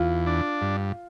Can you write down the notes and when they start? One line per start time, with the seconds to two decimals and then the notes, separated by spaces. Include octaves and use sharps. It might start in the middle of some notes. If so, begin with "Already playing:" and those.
Already playing: E2 F4
0.27 D4
0.62 G2